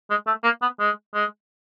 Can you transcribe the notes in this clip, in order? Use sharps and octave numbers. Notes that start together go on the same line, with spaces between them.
G#3
A3
A#3
B3
G#3
G#3